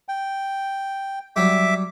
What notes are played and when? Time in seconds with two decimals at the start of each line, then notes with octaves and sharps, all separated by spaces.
0.08 G5
1.36 F#3 G3 E5 D6